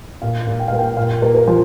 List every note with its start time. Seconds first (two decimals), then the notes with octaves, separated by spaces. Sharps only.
0.22 A#2 F5
0.47 A#2
0.60 G5
0.68 A#3 F5
0.79 G5
0.97 A#2 F5
1.22 A#3
1.34 A#4
1.47 F3